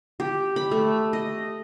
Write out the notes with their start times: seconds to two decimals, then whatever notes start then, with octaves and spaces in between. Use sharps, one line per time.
0.20 G4
0.56 B5
0.71 A3
1.13 D#5